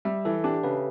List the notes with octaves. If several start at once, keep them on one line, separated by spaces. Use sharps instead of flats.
G3 E5
E3 A4
D4 G4
C#3 B4